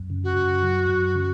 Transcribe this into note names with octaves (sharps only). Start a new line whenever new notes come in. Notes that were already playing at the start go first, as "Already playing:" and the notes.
Already playing: F#2
C#3
F#4
F#2
F#3
F#2
C#3